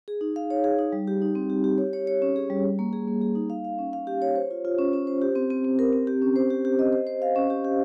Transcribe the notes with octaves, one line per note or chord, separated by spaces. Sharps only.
G#4
D#4
F5
C#5
G#4
D#4
G3
G4
D#4
C4
G4
G4
C#5
C#5
C#5
C#4
G#4
G3
G3
A#3
G#4
A#3
G#4
D#4
F5
F5
C#4
F5
G4
C#5
C5
F4
F4
C#4
C#4
C5
G4
C4
C4
C4
A#4
C4
G4
C#4
C5
G4
G4
D#5
C5
C5
F5
C#4
G4
G4